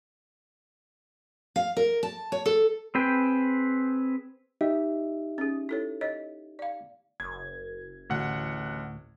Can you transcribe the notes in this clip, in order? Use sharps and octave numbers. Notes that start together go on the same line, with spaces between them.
F5
A#4
A5
C#5
A4
C4 G#4 B4 G5
D#4 G4 D#5 E5
C#4 G#4
E4 A4 C#5
C#5 D#5
D5 F5
F#1 G#6
A1 D2 A2 F#5